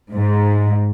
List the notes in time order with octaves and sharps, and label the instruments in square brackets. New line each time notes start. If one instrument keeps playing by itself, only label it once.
[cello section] G#2